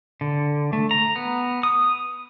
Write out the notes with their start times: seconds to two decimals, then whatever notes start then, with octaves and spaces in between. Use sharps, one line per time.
0.21 D3
0.73 A3
0.91 A#5
1.16 B3
1.63 D#6